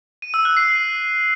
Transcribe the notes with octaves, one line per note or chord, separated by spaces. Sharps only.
D#7
E6
F#6
C7